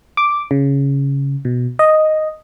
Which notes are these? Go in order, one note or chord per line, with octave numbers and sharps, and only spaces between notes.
D6
C#3
B2
D#5